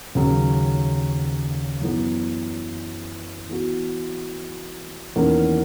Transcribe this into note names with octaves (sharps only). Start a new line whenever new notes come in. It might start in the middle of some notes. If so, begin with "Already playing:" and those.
D#2 C#3 F#3 C#4
F#2 E3 B3
E3 B3 F#4
E2 D#3 A#3 C#4